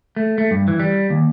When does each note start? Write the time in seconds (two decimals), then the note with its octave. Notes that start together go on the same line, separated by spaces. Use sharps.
0.16 A3
0.38 A3
0.51 G2
0.68 E3
0.80 G3
1.10 D#2